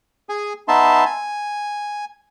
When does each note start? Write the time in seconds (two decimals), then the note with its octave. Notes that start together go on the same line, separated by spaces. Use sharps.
0.29 G#4 G#5
0.68 B3 D#4 E5 A5 C6
1.05 G#5